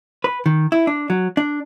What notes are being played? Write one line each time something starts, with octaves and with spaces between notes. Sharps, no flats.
B4
D#3
E4
D4
F#3
D4